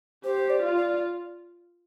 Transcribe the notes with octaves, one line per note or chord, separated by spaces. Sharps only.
G4 C5
D5
F4
D5